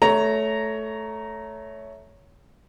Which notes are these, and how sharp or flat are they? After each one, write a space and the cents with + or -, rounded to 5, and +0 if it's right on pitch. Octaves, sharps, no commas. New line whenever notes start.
A3 -10 C#5 +15 A#5 +0